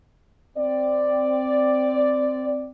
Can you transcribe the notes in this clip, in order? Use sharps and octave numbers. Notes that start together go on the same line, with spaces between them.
C4 D5